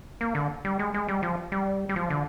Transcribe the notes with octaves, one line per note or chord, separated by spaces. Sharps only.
A#3
D3
G3
G#3
G#3
G3
F3
G3
G3
F3
D3